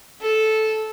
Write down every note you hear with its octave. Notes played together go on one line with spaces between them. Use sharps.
A4